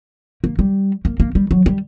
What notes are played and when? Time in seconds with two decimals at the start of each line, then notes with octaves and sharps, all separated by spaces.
0.44 A#3
0.59 G3
1.05 A#3
1.20 A#3
1.35 G3
1.51 F#3
1.66 G3